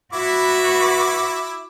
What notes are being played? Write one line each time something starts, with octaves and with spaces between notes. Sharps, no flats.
E4 F#4 B4 E5 D6